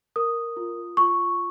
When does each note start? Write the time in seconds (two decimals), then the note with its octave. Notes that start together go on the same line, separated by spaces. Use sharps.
0.16 A#4 D#6
0.57 F4
0.97 F4 C#6